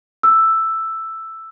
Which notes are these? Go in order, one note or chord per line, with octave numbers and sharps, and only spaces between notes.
E6